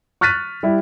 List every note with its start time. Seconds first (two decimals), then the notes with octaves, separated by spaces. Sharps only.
0.21 C#6 F6 F#6 A6 B6 D#7
0.63 G3 E4